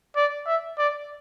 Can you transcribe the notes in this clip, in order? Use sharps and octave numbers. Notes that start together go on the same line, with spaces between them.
D5
E5
D5